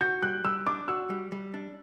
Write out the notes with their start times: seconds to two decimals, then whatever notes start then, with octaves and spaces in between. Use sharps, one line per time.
0.01 F#4 G6
0.22 G3 F#6
0.44 G3 E6
0.66 D4 D6
0.88 F#4 E6
1.10 G3
1.32 G3
1.54 D4